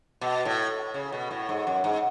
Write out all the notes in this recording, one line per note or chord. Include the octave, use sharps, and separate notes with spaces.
B2
A2
C#3
B2
A2
G#2
F#2
G#2